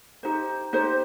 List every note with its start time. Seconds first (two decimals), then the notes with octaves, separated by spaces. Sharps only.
0.23 D#4 G4 C5
0.73 D#4 G4 C5